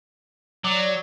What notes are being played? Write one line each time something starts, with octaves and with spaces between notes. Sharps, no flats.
F#3 D5